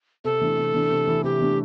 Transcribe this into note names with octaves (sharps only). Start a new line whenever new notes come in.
C3 A4
E3 A3 D4
C3
E3 A3 D4
C3
E3 A3 D4
C3 G4
E3 A3 D4